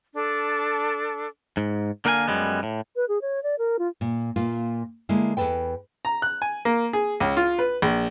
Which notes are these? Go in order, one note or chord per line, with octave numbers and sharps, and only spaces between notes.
D4 A4
G#2
D3 A#3 A#4 F5 F#5 G#5
F#2 G3 G#3 B3
A2
B4
G#4
C#5
D5
A#4
F4
A#2
A#2 A#3 F4
D3 G#3 A#3 E4
E2 C3 A4 B4 G5
A#5
F#6
G#5
A#3
G#4
C#2
F4
B4
A#1